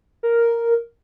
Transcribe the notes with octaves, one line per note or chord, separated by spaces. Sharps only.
A#4